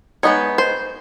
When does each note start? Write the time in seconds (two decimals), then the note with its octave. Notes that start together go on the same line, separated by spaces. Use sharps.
0.23 G#3 B3 D#4 C#5
0.58 C5